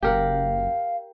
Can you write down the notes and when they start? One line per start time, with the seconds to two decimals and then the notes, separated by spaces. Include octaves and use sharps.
0.03 F#1 G4 A#4 F5 F#5